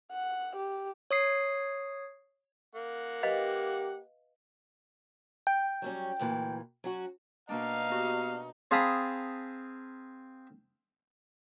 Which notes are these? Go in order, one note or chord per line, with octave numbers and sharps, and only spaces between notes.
F#5
G4
C#5 D#6 C7
A#3 F#5
G4 B4 D#5 F5
G5
F#3 G3 C#4
D2 A#2 E3
F#3 C#4 F#4
B2 A#3 D4 D#4 F5
B3 F#4 G4
C4 G#4 F5 A5 B5 D#6